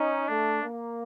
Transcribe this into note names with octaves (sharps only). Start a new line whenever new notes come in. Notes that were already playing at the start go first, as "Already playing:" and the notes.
Already playing: C#4 D#4
A3 D4
A#3